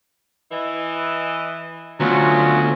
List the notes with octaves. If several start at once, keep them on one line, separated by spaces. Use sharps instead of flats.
E3 D#5
D2 F#3 B3 C#4 F4